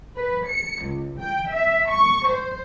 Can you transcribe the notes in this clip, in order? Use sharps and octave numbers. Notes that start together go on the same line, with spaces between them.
B4
C#7
C#2
G5
E5
C#6
C5